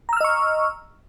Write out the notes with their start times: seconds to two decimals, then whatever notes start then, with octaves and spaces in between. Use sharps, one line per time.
0.09 A#5
0.13 E6
0.17 F6
0.21 D#5
0.24 C#6